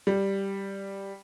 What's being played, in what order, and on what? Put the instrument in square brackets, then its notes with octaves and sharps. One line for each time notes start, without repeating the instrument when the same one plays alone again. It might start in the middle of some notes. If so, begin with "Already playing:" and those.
[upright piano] G3